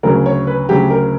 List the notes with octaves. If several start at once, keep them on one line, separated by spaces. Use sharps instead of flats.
D2 C#3 F#3 A#4
C#5
B4
D2 C#3 F#3 G4
A#4